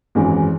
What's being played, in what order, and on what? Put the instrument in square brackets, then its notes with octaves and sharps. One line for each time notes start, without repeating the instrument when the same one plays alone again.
[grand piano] G#1 F#2 E3 G#3